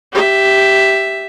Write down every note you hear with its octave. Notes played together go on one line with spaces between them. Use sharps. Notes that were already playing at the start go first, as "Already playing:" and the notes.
G4 E5